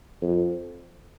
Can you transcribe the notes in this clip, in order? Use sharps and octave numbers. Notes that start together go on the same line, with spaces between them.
F2